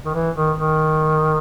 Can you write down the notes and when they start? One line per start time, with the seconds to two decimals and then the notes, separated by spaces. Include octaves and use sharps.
0.06 D#3
0.14 E3
0.36 D#3
0.59 D#3